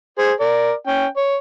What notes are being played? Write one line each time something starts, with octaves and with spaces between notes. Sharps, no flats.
G#4 C5
A#4 D5
C#4 G5
C#5